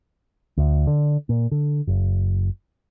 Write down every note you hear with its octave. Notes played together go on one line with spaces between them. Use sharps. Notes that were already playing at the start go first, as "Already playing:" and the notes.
D2
D3
A#2
D3
F#1